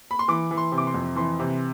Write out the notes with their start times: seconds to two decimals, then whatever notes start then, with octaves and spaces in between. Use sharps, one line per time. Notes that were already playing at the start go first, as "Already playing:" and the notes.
0.11 B5
0.19 C6
0.28 E3 D6
0.51 E3
0.57 C6
0.72 C3
0.78 D6
0.87 C6
0.94 F2
1.16 E3 C6
1.39 C3